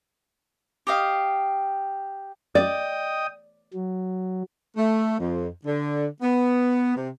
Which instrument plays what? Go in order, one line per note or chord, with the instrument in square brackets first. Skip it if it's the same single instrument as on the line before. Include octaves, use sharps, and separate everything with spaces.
[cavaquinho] G4 D#5 F5
[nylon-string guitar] D5 [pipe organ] D#5 G5 D#6
[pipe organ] F#3
[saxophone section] A3
F2
D3
B3
C3